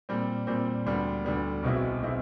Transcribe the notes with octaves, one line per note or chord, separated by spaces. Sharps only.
A#2 G3 C4
A#2 G3 C4
D2 D3 G3 B3
D2 D3 G3 B3
B1 B2 G#3 C4 E4
B2 G#3 C4 E4